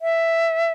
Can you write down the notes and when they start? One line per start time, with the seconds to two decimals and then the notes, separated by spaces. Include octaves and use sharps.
0.02 E5